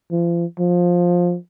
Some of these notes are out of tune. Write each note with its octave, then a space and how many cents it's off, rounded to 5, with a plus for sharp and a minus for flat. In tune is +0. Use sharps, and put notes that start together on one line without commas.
F3 -35
F3 +15